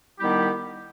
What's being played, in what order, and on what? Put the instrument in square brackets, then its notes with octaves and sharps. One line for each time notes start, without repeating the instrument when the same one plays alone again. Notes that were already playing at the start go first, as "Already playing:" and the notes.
[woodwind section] D#3 G3 B3 E4 G4